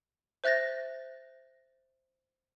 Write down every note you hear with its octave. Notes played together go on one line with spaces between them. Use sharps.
C5 E5 F#6 A6 A#6